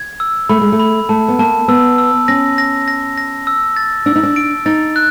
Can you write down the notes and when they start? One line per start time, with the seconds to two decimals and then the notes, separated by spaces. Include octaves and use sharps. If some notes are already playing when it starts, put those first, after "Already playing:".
Already playing: G#6
0.20 E6
0.49 A3 B5
0.61 G#3
0.72 A3
0.79 B5
1.09 A3 A5
1.28 B3
1.39 A#3 A5
1.68 B3 E6
1.98 E6
2.28 C#4 A#6
2.58 A#6
2.88 A#6
3.18 A#6
3.47 E6
3.76 A6
4.06 D4 E6
4.16 D#4
4.23 D4
4.36 D7
4.66 D#4 A6
4.96 F#6